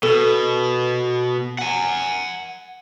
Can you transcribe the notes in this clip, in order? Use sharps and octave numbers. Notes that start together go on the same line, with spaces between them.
B2 A4
F#5 G#5